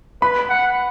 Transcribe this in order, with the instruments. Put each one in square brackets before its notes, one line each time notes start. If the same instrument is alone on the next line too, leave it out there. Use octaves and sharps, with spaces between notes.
[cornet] B4 [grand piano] B5
[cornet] F#5